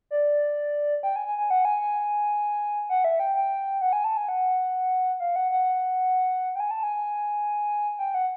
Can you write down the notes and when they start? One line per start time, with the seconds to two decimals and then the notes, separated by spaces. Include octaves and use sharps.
0.11 D5
1.03 G5
1.16 G#5
1.26 G#5
1.38 G#5
1.50 F#5
1.65 G#5
1.81 G#5
2.90 F#5
3.04 E5
3.20 G5
3.35 G5
3.81 F#5
3.93 G#5
4.04 A5
4.17 G#5
4.29 F#5
5.20 F5
5.36 F#5
5.51 F#5
6.55 G5
6.60 G#5
6.71 A5
6.83 G#5
7.99 G5
8.14 F#5